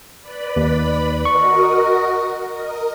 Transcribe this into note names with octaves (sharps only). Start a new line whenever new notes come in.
B4 D5 B5
D#2
F#4 A#4 D#5 C#6
A#4 D#5